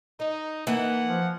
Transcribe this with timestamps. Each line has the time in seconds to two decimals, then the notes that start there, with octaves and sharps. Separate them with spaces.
0.20 D#4 D#5
0.67 E3 A#3 D#4 F#5
1.05 F3